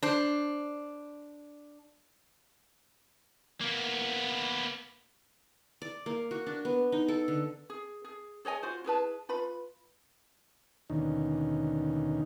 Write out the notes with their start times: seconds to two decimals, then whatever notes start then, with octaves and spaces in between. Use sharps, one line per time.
0.03 D4 C5
3.61 A#3 B3
5.82 D5
6.06 A#3
6.31 F#4
6.46 D4
6.65 B3
6.92 D#4
7.08 A4
7.28 D3
7.70 G#4
8.05 G#4
8.45 G#4 C#5 D#5 G#5
8.63 F4 F#4 C5
8.84 E4 G#4 B4 A5
9.29 F4 B4 B5
10.90 D#2 B2 D3 D#3 C#4 D#4